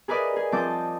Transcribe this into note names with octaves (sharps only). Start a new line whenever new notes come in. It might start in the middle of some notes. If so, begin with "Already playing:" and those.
G#4 A#4 B4 D5 D#5
G#4
F3 C4 D#5 A5 D6 G6